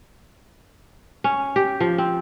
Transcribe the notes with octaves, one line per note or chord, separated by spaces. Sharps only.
C#4
G4
F3
C4